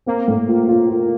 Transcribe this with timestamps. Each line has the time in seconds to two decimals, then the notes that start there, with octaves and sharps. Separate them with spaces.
0.06 A#3 C4
0.28 A2
0.48 F4
0.68 F4
0.90 F4